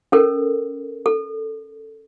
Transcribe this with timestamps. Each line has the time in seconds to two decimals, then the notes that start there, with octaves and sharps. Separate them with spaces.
0.12 C#4 A4 A#4
1.06 A4